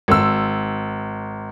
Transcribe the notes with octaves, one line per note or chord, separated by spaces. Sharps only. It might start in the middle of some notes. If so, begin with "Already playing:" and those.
G#1 E6